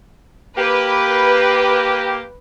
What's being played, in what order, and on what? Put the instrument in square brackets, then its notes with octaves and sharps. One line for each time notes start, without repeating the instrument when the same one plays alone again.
[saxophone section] A#3 G4 [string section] B4